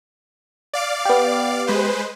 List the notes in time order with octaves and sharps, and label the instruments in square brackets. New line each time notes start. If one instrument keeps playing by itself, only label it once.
[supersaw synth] D5 F5 D6
[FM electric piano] B3 G4
[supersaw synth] G#3 B4 C5